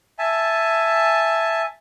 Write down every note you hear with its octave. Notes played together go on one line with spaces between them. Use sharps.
E5 G#5 A5